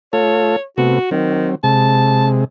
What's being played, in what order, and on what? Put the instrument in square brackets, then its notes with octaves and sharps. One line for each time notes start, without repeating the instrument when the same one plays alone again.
[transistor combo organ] A3 F4 A4 [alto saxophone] C#5
[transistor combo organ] C3 A3 B3 [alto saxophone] F#4
[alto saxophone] D#3 [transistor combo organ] F#3 C4
[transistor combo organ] C3 G#3 [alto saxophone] A5